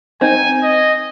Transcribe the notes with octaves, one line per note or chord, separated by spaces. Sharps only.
C4 D#4 G#5
D#5